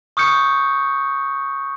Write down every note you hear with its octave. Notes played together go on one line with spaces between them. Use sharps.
C#6 D#6 F6 G6 C#7